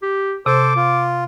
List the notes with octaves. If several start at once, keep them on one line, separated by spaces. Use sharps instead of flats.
G4
C3 A4 C5 D6
F4